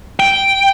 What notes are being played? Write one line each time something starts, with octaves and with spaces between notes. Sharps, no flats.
G5